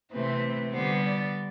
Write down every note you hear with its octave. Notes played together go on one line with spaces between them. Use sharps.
C3 E3 A3 C4 B4
D3 G3 B3 C5
D5